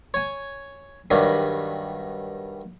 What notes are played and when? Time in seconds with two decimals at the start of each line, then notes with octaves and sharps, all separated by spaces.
0.14 C#5 G#5
1.11 G2 D#3 F#3 G3